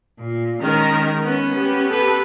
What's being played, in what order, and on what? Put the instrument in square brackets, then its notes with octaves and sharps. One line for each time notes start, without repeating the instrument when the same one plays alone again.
[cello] A#2
[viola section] D#3 G#3 A#4 [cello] C#4
[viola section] B3 [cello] C#4
[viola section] B3 G4
[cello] A4 B4